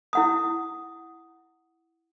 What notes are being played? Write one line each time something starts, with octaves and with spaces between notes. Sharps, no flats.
E4 F#5 D#6